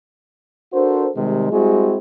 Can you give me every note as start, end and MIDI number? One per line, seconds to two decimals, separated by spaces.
0.73 1.09 62
0.73 1.09 66
0.73 1.09 69
0.73 1.09 70
0.73 1.09 72
1.16 1.49 48
1.16 1.49 51
1.16 1.49 55
1.16 1.49 56
1.52 1.98 55
1.52 1.98 56
1.52 1.98 60
1.52 1.98 64
1.52 1.98 66
1.52 1.98 68